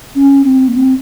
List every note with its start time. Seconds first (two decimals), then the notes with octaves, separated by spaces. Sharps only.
0.15 C#4
0.44 C4
0.68 A#3
0.73 C4